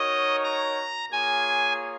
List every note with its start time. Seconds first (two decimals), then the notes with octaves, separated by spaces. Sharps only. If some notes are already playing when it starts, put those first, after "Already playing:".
Already playing: D#4 F#4 A#4 C#5 D#5
0.44 A#5
1.11 A#3 F4 G#4 C#5 G#5